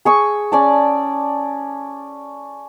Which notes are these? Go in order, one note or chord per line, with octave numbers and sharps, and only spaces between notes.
G#4 C#6 E6
C#4 D5 A5